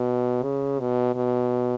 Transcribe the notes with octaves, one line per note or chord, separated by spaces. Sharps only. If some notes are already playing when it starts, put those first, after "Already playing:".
Already playing: B2
C#3
B2
B2